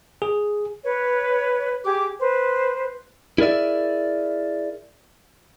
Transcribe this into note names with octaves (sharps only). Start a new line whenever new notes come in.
G#4
B4 C#5
G4 G#4 D6
B4 C5
E4 G#4 A#4 D5 E5